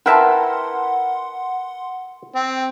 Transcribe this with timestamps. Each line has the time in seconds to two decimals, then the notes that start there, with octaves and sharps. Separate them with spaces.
0.06 E4 A#4 B4 E5 F#5 G5 A5 C6
2.35 C4